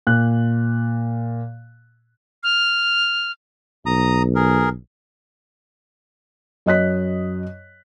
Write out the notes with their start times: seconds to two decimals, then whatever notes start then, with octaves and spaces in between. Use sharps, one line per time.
0.07 A#2 F#6
2.43 F6
3.86 B1 A#5 D#6
4.35 G#4 A#4
6.66 F#2 D#5 F#6 B6